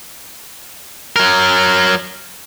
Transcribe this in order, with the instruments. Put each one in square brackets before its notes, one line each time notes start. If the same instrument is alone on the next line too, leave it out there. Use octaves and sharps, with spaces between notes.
[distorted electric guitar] F#3 A#4